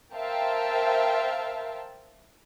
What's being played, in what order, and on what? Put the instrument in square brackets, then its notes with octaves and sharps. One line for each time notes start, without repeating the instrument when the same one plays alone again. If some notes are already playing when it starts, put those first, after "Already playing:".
[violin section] A#4 C5 E5 F5 G5 A5